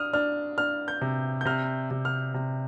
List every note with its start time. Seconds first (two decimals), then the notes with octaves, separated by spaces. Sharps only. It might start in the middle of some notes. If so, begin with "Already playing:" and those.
Already playing: D4 D#6 F6
0.13 D4 F6
0.58 D4 F6
0.88 G6
1.01 C3
1.41 G6
1.45 C3 F6
1.91 C3
2.05 F6
2.34 C3